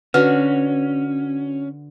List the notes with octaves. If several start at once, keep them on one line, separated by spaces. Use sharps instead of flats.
D3 C#4 F#4 B4